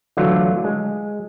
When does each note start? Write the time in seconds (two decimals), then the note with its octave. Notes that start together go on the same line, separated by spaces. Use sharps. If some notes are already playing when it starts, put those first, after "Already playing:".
0.17 D3 E3 F#3 A3 F4 C#5
0.64 G#3